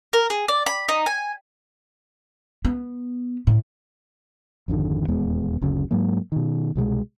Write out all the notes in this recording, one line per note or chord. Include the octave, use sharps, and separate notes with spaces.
A#4
G#4
D5
B5
D#4
G#5
B3
A2
G#1 F2 D3 D#3
D#1 E2 G#3 B3
F#1 D2 C#3 F#3
G#2 F#3 G#3 A#3
B2 D#3
C2 B2 F3 G#3